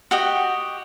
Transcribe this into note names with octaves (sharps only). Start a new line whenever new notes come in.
F#4 G4 D#5